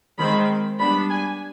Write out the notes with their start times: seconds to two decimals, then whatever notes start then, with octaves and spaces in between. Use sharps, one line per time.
0.19 D#3 G#3 C4 B5
0.79 G3 B3 D4 B5
1.10 G#5